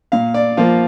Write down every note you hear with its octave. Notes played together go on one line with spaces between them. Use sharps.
A#2 F5
D5
F3 A#3 F4